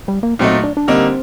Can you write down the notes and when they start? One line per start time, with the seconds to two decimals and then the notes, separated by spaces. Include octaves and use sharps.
0.08 G3
0.23 A#3
0.39 A#2 F#3 A3 C4 D#4
0.64 D4
0.77 D4
0.88 D3 G3 A#3 C4 D#4